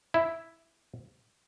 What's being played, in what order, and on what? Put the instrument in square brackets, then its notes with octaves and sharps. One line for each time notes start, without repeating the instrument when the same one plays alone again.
[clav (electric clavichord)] E4